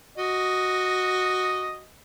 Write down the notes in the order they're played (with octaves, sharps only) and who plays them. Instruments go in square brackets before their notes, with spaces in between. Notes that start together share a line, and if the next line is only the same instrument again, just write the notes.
[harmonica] F#4 D#5